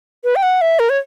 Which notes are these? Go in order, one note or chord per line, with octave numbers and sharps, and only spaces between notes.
B4
G5
F#5
E5
A#4
C#5